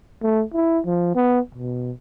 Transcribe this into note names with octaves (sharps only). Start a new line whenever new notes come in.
A3
E4
F3
B3
B2